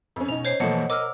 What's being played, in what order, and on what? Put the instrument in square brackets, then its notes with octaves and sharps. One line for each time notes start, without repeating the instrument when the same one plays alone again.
[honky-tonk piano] F2 C#4
[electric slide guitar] B2 [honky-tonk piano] C#4 D#4 [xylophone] F7
[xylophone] C5 C#5 C7
[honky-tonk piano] B2 F3 A3 [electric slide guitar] E3 A#3 A5 [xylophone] D#5 F#5
[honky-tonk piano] A#4 [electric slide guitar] D#5 [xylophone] D6 E6 F6